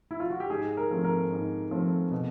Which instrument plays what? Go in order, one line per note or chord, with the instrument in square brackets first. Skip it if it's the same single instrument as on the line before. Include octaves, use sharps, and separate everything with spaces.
[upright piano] E4
F4
F#4
G4
G#2 G#4
A#4
F3 A3 C4
A#4
G#2
F3 A3 C4
B2